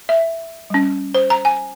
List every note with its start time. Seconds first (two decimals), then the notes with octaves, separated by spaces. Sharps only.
0.09 E5
0.70 G3 C#4
1.15 C5
1.30 A#5
1.45 G#5